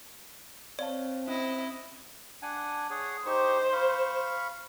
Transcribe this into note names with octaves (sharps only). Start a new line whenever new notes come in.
C4 C#5 D5 F5 A5
C#4 E4 C5 D#5
D4 F#5 G#5
G#4 C#5 F#5
D#4 G4 C5 C#6
F5 B5 C#6